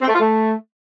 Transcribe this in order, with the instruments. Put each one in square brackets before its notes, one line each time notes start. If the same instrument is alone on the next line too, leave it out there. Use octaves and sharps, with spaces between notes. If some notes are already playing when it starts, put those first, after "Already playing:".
[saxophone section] C4
A3
F4
A3